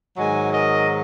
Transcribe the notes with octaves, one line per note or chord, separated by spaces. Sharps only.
G#2 D#3 F#3 D#5 G#5
A#4 D#5